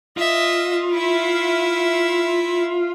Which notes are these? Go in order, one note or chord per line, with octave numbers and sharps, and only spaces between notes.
F4 D#5 E5
E4 E5